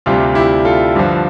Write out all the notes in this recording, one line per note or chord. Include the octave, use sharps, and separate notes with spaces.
D2 C3 G3 D4 F4
E4 G4
F4 A4
G2 D3 F3